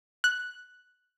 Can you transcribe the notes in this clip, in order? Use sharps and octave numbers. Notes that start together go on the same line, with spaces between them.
F#6